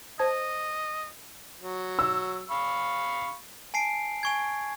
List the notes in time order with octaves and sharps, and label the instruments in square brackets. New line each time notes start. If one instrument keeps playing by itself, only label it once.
[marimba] C5 A5 G#6 [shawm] D#5
[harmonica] F#3
[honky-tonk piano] E6
[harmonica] F5 B5 C#6
[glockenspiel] G#5 A5 C7 D7
G#5 C#6 G#6